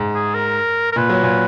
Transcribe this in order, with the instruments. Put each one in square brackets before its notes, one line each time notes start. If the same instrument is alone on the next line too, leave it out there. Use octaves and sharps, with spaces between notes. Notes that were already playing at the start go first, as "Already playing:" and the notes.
Already playing: [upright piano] G#2
[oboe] G#4
A#4
A#4
[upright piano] A#2 [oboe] B4
[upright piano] F#3
A#2